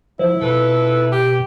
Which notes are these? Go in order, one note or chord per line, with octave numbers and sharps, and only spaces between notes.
F3 E4
F2 B2 A4 B4
G4